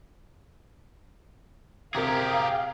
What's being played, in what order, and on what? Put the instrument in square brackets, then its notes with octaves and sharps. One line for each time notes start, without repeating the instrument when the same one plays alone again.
[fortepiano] C3 A#4 [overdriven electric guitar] G4 G#4 [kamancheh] F5 [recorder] A#5